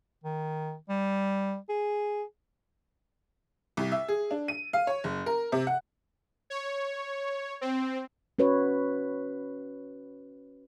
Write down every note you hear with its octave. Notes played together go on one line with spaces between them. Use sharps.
D#3
G3
G#4
C2
E5
G#4
D4
D#7
F5
C#5
F#1
A#4
C3
F#5
C#5
C4
C#4 F#4 B4 C#5